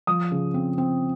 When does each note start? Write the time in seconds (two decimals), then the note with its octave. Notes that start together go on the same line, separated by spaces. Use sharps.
0.07 F3 D#6
0.31 C#3
0.54 C4
0.78 C4